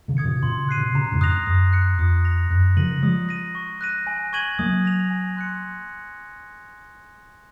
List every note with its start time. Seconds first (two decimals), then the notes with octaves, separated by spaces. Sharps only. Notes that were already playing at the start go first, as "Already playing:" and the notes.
0.08 C3 D#3
0.17 D#6 G#6 C#7
0.25 A#2 C#3
0.42 A#2 C#3 C6
0.69 F#6 C7 D#7
0.77 A#2 C#3
0.95 A#2 C#3 A#5
1.12 F2 G#2
1.21 D#6 F#6 A#6 F7
1.46 F#2 D#6
1.73 F#6 C#7
1.98 F2 D#6
2.24 A#6 F7
2.50 F#2 F#6
2.77 C#3 F3 A#6 D#7 F#7
3.02 F3 G#3 D#6
3.29 A#6 D#7
3.55 C#6
3.81 F#6 A#6 D#7
4.07 G#5
4.33 C#6 G#6 D#7 F#7
4.59 F#3 A#3 D#6
4.85 A#6 F7
5.10 G#5
5.37 C6 F#6 C#7